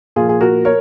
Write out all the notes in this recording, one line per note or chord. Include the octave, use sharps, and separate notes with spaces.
A#2 F3 F4 G#4
G#4
F#4 A#4
A#4 C#5